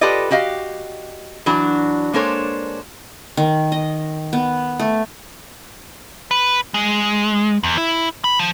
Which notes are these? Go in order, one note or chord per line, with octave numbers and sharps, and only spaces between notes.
F4 G4 A4 B4 D5 D#5
F#4 G4 D#5 F5
E3 F#3 D4 F#4
G#3 A#3 D4 A4 C5 C#5
D#3
D#5
B3
A3
B4
G#3
E2
E4
B5
F3